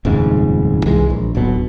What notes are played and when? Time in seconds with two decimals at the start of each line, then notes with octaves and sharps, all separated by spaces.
0.05 D#1 F2 G#2 C#3
0.86 C2 E3 G#3
1.10 A#1
1.35 D1 B1 B2